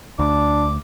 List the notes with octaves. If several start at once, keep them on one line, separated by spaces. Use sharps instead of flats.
D2 D4 D6